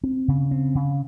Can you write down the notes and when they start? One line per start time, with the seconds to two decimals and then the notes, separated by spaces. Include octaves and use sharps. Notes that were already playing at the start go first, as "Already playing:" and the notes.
0.03 C4
0.28 C#3
0.51 C4
0.75 C#3